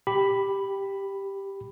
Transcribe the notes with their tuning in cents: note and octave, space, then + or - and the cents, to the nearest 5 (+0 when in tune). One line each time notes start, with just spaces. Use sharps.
G4 +0 B5 +0